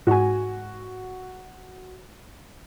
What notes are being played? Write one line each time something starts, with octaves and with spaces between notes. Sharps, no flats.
G#2 F#4 G#5